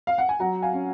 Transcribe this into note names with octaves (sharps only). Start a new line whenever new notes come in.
F5
F#5
G#5
F#3 F#5 A#5
F5 G#5
C#4